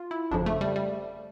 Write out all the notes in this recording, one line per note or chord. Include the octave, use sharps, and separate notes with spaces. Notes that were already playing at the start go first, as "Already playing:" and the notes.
Already playing: F4
E4
G1 F2 C#3 F3 D4
A3
G3
G3